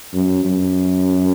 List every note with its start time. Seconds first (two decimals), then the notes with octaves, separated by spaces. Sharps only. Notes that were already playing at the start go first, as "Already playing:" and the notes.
0.14 F#2
0.45 F#2